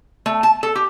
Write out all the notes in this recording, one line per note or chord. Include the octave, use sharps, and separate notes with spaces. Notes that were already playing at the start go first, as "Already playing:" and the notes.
A3
A5
A4
G4